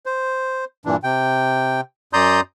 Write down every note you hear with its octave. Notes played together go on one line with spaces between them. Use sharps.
C5
G2 A#2 E3 D4
C3 G5
F#2 D5 A#5 C6 D#6 G6